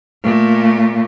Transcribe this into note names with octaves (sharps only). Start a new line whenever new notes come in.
A#2 A3